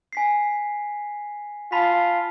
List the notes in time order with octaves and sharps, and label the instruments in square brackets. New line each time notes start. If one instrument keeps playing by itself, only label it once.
[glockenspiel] G#5 B6 C7
[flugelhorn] F4 [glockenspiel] A5 B5 B6